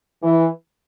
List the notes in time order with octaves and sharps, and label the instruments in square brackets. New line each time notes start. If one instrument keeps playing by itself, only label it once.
[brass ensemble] E3